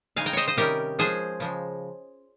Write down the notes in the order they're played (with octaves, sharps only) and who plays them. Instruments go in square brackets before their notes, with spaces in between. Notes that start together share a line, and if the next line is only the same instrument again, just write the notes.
[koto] C#3 G#3 D#4 F5 G#5
G5 A#5
C5 C#5 D#5
C5 D#5
C3 D#3 G3 C#4 G4 A#4
F3 G#3 C#4 G#4 C5
C#3 F3 G#3